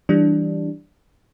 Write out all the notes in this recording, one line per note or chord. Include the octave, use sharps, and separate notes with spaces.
E3 G3 D4